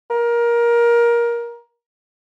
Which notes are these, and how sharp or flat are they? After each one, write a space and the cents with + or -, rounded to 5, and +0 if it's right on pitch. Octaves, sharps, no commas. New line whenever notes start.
A#4 +20